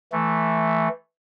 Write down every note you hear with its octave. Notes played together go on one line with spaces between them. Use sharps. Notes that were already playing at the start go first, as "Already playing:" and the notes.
E3 A3